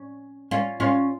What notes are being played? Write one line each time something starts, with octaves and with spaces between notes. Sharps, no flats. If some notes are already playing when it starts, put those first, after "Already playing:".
Already playing: C#4
C#4 F4
C#4 F4